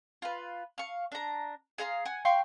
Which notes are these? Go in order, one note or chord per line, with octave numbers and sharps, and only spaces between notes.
F4 B4
F5 C#6
D4 A#5
G#4 F5 A#5 C6
F#5 G#5
F5 G5 C6 C#6